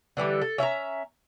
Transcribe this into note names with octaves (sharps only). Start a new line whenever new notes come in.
D3 E3 G3 A4
A4
C#4 E5 A5 A#5